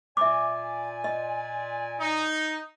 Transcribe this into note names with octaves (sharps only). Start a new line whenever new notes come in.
A#2 D5 E5 G#5 D6
D#5
D#4